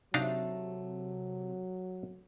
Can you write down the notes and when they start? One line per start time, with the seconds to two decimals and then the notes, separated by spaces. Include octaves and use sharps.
0.14 C3 F#3 A3 D4 D#4 F5